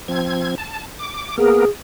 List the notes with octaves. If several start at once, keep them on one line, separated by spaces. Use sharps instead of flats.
F3 C4 G#6
A5
D6
A#3 B3 G#4 A#4